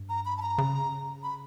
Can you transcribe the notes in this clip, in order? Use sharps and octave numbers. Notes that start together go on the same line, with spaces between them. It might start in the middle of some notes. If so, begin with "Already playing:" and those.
Already playing: G2
A#5
B5
A5
A#5
C#3
B5